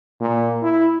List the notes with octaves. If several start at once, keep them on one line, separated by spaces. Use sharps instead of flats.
A#2
E4